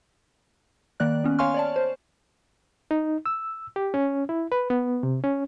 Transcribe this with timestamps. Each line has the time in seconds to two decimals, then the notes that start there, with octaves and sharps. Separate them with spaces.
1.00 D#3 A#3 D5 F#6
1.24 B3 C#4
1.39 C#5 F5 G#5 C6 C#6 F6
1.54 C#5 D5 A5
1.76 C5
2.91 D#4
3.26 E6
3.76 G4
3.94 C#4
4.29 E4
4.52 B4
4.70 B3
5.03 C3
5.24 C#4